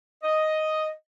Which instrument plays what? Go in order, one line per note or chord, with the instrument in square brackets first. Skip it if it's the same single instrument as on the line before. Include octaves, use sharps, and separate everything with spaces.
[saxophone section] D#5